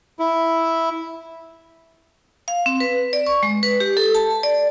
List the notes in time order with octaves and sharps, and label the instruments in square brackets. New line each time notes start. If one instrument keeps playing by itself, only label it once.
[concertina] E4
[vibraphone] F5
C4
B4
D5
C#6
G#3
B4
G4
A4
A5
D5